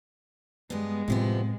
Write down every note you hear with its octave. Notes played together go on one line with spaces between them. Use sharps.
G2 G#3 B3
A2 C3 F3 B3 C4